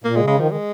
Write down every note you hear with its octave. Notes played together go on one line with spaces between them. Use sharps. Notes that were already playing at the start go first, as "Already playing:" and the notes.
A#2 A#3
G#3
C#3
G#3
D#3 F3
D#3 G#3